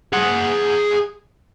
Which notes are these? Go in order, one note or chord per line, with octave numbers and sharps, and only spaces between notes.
G#4 F#5